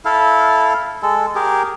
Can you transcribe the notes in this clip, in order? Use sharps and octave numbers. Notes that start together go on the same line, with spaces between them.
E4 A4 F5
G#3 A4
G4 G#4 A#4